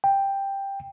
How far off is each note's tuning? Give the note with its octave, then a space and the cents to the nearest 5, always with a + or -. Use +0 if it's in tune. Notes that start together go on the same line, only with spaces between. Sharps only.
G5 +10